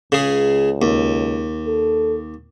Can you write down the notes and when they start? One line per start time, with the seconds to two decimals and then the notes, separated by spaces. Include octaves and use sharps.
0.12 C#2 C#3 G#4
0.82 D#2
1.67 A4